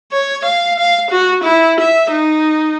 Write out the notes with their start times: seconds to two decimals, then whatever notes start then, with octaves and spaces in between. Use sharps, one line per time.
0.12 C#5
0.45 F5
0.79 F5
1.10 F#4
1.44 E4
1.80 E5
2.11 D#4